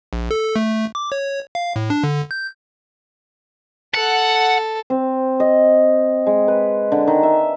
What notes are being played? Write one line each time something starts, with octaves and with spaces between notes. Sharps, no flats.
A#1
A4
A3
D6
C#5
F5
A2
D4
D3
G6
A4 F#5
C4
D#5
G#3
B4
D3
D#3
E5